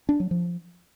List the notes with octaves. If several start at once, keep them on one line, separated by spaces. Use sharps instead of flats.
D4
F#3
F3